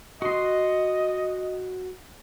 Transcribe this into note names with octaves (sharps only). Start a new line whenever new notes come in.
F#4 D#5 C6